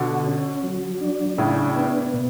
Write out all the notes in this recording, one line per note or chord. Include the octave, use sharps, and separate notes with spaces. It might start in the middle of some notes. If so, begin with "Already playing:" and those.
Already playing: B2 D3 F#4
C#4
F#3
D4
A2 C#3 D4
B3
B2